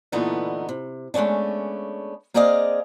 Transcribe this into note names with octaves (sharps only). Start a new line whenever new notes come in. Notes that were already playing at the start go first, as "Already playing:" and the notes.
A#2 D3 E3 A3 B3 D#4
C3
G#3 A3 B3 C#4 D4
A#3 C4 G#4 D5 D#5 F5